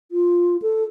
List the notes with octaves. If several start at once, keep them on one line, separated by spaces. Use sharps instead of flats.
F4
A4